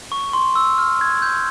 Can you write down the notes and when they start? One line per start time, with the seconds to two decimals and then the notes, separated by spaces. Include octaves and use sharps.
0.12 C#6
0.33 C6
0.56 E6
0.78 F6
1.01 G#6
1.22 G6